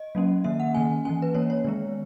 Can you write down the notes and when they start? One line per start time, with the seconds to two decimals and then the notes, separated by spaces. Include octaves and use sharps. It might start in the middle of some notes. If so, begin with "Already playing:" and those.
Already playing: D#5
0.15 F#3 A#3 C#4
0.44 D#3 A#3 C#4 E5
0.60 F#5
0.74 D#3 A#3 C#4 G#5
1.05 E3 A#3 C#4 G#5
1.22 B4
1.34 E3 A#3 C#4 C#5
1.50 C#5
1.65 D#3 G#3 B3